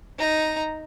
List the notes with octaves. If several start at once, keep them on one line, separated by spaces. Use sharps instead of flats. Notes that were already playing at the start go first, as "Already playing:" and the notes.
D#4 A#5